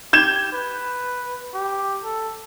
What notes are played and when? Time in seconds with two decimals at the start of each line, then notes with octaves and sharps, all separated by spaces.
0.13 G4 G6 G#6 E7
0.52 B4
1.54 G4
2.04 A4